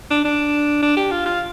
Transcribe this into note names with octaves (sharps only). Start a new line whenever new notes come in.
D4
D4
D4
G4
F4
F4